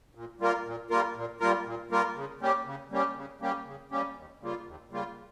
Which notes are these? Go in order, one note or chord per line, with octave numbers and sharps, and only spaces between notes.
A#2
G3 A#3 F4 A#4
A#2
G3 A#3 F4 A#4
A#2
G3 A#3 F4 A#4
A#2
G3 A#3 F4 A#4
C#3
G3 A#3 C#4 G4
C#3
G3 A#3 C#4 G4
C#3
G3 A#3 C#4 G4
C#3
G3 A#3 C#4 G4
D#2
C#3 G3 A#3 F4
D#2
C#3 G3 A#3 F4